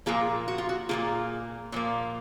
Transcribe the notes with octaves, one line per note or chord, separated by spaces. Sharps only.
A#2 F3 A#3 F4 G#4
F#4
F4
F#4
A#2 F3 A#3 F4 G#4
A#2 F3 A#3